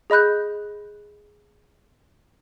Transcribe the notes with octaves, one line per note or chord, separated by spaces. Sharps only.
G#4 D#5 B5 F#6 G6